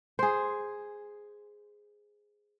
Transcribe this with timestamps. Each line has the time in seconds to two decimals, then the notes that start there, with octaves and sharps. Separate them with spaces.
0.19 G#4 C5